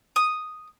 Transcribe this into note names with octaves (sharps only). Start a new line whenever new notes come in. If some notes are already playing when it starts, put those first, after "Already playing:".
D#6